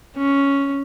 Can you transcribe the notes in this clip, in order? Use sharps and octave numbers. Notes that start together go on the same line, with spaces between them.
C#4